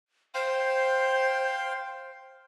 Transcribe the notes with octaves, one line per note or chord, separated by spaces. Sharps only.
C5 F5 G5 C6